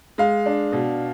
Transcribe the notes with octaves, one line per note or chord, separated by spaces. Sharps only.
G#3 F5
D4
B2